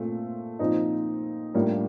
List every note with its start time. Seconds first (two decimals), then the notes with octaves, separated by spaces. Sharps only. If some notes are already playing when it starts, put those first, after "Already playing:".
Already playing: A#2 A3 C4 F4
0.59 A#2 F3 C4 D#4
1.54 A2 G3 A#3 D4 F4